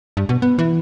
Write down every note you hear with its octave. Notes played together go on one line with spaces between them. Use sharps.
G2
B2
B3
E3